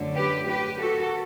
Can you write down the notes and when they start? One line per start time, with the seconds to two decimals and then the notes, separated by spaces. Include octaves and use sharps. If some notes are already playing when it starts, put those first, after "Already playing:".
Already playing: F#2 D3 A3
0.15 G4 B4
0.47 G4 B4
0.80 F#4 A4